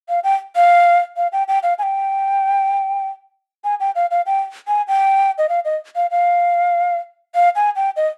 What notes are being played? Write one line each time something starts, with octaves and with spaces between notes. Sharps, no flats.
F5
G5
F5
F5
G5
G5
F5
G#5
G5
G#5
G5
F5
F5
G5
G#5
G5
D#5
F5
D#5
F5
F5
F5
G#5
G5
D#5